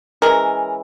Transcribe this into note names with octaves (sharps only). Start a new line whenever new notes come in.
E3 G#3 C#4 A#4